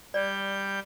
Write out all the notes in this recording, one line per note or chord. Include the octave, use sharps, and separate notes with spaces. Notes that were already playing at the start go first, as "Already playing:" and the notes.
G3 D5 G6